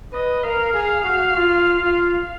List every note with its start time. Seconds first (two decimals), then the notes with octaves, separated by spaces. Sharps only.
0.13 B4 D#5
0.43 A#4 F5
0.74 G#4
1.04 F#4
1.35 F4
1.81 F4